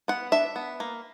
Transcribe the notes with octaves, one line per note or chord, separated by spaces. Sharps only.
B3 F#5
D4 E5
B3
A#3